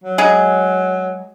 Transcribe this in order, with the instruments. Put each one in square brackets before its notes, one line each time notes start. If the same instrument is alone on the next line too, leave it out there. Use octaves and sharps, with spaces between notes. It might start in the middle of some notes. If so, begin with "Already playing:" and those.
[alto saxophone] F#3
[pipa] G#3 G#4